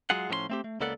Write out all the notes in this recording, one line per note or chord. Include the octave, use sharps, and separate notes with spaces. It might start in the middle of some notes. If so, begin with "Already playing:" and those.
F#3 G#3 F4 G#4 F#5
A2 F3 C#4 E5 C6
A3 C4 G4
A3
C#2 A#3 B3 A4 D5 F#5